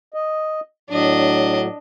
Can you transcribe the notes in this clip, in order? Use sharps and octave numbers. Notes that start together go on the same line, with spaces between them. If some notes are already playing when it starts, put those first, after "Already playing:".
D#5
A2 F#3 D4 D#5